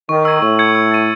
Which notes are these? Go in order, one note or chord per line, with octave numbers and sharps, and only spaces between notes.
D#3 C#6
E6 G#6 D#7
A2 C#6
G#6 C#7
E6
A6 D#7